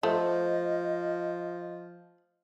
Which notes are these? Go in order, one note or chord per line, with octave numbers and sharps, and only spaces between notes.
F3 A3 C5 D#5